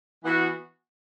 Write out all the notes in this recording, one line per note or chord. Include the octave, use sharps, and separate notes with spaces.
E3 B3 F#4